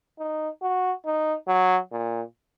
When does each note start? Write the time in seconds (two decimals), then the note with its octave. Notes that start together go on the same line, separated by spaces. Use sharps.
0.19 D#4
0.62 F#4
1.06 D#4
1.48 F#3
1.92 A#2